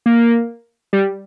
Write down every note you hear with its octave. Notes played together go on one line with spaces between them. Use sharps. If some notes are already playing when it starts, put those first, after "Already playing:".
A#3
G3